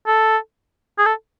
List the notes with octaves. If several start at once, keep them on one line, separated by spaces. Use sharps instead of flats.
A4
G#4
A4